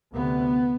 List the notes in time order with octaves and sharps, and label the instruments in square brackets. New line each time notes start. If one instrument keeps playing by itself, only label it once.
[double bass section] D2 C3 B3